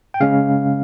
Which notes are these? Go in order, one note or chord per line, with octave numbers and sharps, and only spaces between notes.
G5
C#3 G#3 C#4 F5